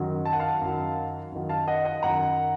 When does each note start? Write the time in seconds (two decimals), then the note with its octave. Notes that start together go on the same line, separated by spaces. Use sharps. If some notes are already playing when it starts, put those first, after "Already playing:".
Already playing: F#2 D#3 F#3
0.26 A5
0.33 F#5
0.39 F5 A5
0.62 F#2 D#3 F#3
1.32 F#2 D#3 F#3
1.49 F5 A5
1.68 D#5 F#5
1.85 D#5 F#5
2.03 F#2 D#3 F#3 F#5 A#5